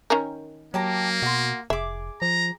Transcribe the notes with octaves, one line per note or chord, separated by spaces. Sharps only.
D#3 C#4 A#4
F#3 A#3 G4 A5 A#5
B2 F#4 C6
F1 G#4 E5 D6
F3 A#5